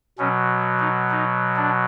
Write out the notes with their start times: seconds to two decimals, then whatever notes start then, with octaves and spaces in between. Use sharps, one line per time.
0.18 B2 F#3 C#4
0.79 D#4
1.10 D#4
1.57 D4